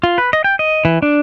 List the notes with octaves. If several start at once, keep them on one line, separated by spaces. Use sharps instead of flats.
F4
B4
D#5
G5
D#5
E3
D4